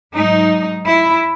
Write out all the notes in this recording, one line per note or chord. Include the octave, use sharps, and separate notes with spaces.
G#2 F#3 D#4
E4